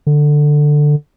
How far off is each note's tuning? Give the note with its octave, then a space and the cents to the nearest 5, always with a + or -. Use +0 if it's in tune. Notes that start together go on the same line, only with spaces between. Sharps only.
D3 +10